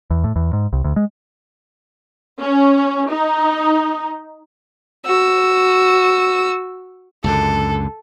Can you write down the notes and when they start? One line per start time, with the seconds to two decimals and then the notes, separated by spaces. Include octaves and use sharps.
0.11 E2
0.24 A2
0.36 E2
0.53 G#2
0.73 C2
0.84 D2
0.96 G#3
2.41 C#4
3.11 D#4
5.05 F#4 E6
7.24 C#2 F#2 D3 A4